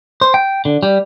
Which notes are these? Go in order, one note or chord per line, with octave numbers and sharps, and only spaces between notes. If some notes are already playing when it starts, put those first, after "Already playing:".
C5
G5
D3
G3